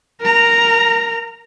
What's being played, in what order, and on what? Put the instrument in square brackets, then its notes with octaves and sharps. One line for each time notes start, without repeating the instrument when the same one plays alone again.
[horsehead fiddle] A#4 A#5